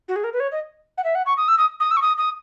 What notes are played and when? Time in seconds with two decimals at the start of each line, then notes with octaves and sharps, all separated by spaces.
0.08 F#4
0.16 G#4
0.24 A#4
0.33 B4
0.40 C#5
0.52 D#5
0.98 F#5
1.04 E5
1.15 F#5
1.26 C#6
1.37 D#6
1.48 E6
1.58 D#6
1.80 D#6
1.91 E6
1.97 C#6
2.02 D#6
2.18 D#6